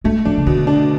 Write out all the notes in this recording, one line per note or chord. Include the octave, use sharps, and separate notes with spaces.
G#3 A3
F3 D4
C#3
B2 D3
D4